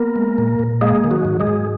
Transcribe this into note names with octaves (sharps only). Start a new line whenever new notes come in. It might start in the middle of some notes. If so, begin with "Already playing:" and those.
Already playing: A#3 B3 A#4
G#3
A#2
A#2
G#3 A#3 G#4
D#3
F#3 F#4
G#2
G#3 G#4
G#2